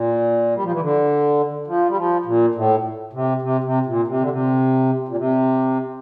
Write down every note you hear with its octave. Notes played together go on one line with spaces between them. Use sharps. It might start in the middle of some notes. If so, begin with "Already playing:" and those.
Already playing: A#2
G3
F3
E3
D3
F3
G3
F3
A#2
A2
C3
C3
C3
A#2
C3
D3
C3
A#2
C3